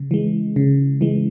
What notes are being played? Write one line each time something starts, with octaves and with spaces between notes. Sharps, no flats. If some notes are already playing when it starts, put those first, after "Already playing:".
Already playing: C#3
E3 G#3
C#3
E3 G#3